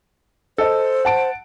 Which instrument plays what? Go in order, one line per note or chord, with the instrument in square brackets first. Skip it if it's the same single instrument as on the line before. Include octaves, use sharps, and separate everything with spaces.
[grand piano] A4 D#5 [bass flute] C5
[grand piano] F#5 A5 D7